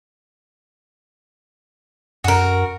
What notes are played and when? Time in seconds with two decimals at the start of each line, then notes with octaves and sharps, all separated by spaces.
2.24 F#2 F#4 A#4